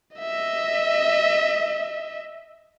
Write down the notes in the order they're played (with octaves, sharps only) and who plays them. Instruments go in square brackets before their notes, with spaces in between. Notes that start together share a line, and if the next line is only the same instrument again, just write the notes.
[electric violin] D#5 E5